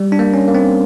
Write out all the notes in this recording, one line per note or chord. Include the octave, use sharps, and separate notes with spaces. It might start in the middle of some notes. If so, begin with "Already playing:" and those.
Already playing: G3
D4
A#3
C#4
A#3
C4